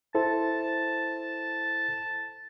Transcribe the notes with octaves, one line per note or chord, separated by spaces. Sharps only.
E4 A4 C5 A5